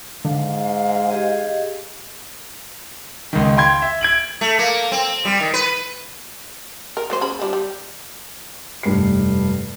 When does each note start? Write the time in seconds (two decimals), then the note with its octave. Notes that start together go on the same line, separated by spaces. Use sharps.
0.25 G#2 D3 F5
1.10 G4 G#4 D#5
3.33 C#2 D#3
3.57 F5 G5 C6 G#6
3.82 E5
4.01 G#6 D7 F#7
4.41 A3
4.59 A#3
4.92 C4
5.25 G3
5.40 D#3
5.54 B4
6.97 A#4
7.10 F#3 A#3 C5
7.21 C#4 G#4 B5
7.40 F3 G3 D4
7.53 G3
8.83 F1 G2 C7